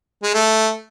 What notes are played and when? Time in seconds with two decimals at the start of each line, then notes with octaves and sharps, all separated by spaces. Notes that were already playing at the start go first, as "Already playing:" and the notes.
0.23 G#3
0.34 A3